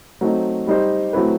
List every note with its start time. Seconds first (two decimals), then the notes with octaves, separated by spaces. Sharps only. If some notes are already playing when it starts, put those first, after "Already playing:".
0.21 F#3 A3 C4 D#4
0.67 G3 D#4 G4 C5
1.13 F#3 A3 C4 E4 B4